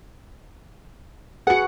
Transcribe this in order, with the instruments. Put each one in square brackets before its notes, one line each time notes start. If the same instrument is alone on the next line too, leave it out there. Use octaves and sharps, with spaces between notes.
[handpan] F#4 B4 [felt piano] G#4 C#7 [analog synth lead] F#5